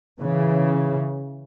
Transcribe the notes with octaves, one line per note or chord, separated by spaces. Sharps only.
C#3 E3